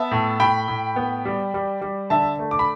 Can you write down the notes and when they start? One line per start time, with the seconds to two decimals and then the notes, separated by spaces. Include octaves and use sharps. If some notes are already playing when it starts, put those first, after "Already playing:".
Already playing: B3 E5 A5
0.11 A2
0.39 A2 G5 B5
0.68 A2
0.96 B3
1.25 G3
1.54 G3
1.81 G3
2.10 D3 E5 A5
2.39 A3
2.51 D6
2.59 B5